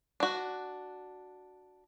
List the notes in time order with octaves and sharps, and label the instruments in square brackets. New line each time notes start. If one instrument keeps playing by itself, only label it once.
[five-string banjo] D4 F#4